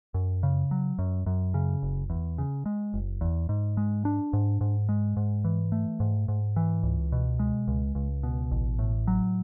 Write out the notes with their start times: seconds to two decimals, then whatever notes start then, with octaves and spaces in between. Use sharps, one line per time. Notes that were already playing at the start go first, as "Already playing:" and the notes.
0.14 F#2
0.43 C#3
0.71 F#3
0.99 F#2
1.26 F#2
1.54 C#3
1.83 F#1
2.10 E2
2.38 C#3
2.66 G#3
2.94 F#1
3.21 E2
3.49 G#2
3.77 G#3
4.05 D4
4.33 G#2
4.61 G#2
4.89 G#3
5.17 G#2
5.45 E3
5.72 A3
6.00 G#2
6.28 G#2
6.56 E3
6.83 C#2
7.12 B2
7.39 G#3
7.68 C#2
7.95 C#2
8.23 B2
8.51 A1
8.79 A2
9.07 F#3